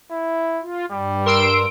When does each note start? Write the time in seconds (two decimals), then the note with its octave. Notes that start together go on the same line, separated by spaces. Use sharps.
0.11 E4
0.62 F4
0.91 G2 G3
1.26 A#4 C6 E6 D7